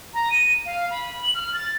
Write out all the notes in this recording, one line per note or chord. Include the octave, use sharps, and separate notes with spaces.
A#5
D#7
F5
B5
F#7
F6
A6